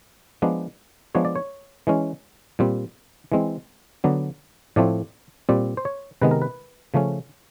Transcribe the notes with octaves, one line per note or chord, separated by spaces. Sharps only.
F3 G#3 B3 D4
F3 G#3 B3 D4 C#5
D5
C#5
E3 G#3 C#4
A#2 G3 C4
E3 G#3 C4
D3 F#3 B3 D4
A2 F3 A3 C4 D5
A#2 G3 C4 D5
C5
C#5
C3 D#3 G#3 B3 B4
A#4
B4
C#3 F3 A3 C#4